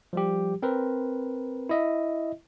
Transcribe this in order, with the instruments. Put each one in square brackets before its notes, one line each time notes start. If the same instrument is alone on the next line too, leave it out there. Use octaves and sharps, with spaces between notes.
[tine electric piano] F3 G3 G4
C4 A#4 B4
E4 D#5 E5